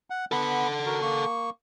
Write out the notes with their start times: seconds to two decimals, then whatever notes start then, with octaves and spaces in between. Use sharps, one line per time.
0.10 F#5
0.32 B3 A4 F#5 B5
0.86 F#4 A#4
1.02 A#3 C#6